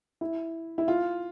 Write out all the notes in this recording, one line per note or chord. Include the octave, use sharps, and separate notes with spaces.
E4
E4
F4